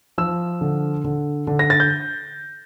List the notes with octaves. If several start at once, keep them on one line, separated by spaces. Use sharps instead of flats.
F3 E6
D3
D3
D3
A#6
A6
G6